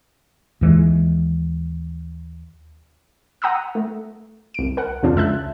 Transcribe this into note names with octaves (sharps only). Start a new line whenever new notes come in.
D#2 E3 G3 G#3
F#5 A#5 D#6 E6
A3
C2 D7
A#4 F#5
F2 C3 C#4 D4 F4
C#2 E5 A5 F#6